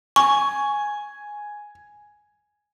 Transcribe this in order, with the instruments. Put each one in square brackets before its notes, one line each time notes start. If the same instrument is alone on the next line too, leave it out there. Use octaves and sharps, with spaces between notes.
[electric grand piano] G#5 [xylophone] C#6